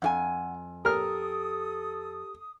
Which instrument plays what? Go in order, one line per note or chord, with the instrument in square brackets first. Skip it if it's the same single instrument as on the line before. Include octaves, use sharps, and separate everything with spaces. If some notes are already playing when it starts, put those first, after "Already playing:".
[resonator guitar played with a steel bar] F2 E4 G#5 [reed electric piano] F#5
[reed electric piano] G4 [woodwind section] A4 D#6 [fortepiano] A#4 F6